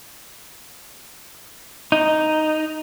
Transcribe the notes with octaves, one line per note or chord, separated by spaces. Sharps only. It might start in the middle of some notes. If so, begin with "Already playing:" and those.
D#4